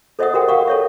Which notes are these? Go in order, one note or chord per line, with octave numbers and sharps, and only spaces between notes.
A4 C5 D#5 E5 F#5 D#6
F#4 G4 A#4 F#5 G5
A#4 F5 F#5 C#6
A4 C#5 E5